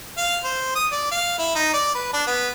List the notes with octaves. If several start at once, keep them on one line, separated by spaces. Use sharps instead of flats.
F5
C5
D#6
D5
F5
E4
D#4
D5
B4
D4
B3